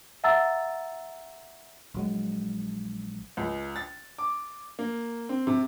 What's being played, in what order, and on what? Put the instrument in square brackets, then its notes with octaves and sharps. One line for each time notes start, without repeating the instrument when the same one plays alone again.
[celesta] E5 F#5 A5 A#5 E6 A6
[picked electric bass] A#1 F#3 G#3
[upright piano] C#2
A6
D6
A#3
C4
C3